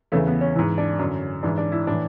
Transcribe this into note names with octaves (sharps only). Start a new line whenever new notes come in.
E2 C#3 E3 A3
B3
C#4
G#2 E3 E4
D4
F#2 D3 C#4
G#2 E3 D4
D4
E4
A2 E3 D4